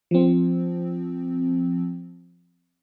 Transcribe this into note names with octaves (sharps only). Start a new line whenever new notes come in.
F3 C4